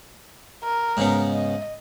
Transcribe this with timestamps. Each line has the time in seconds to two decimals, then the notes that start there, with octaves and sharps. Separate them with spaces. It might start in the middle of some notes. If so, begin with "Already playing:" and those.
0.63 A#4
0.97 G#2 C#3 B3
1.31 D#5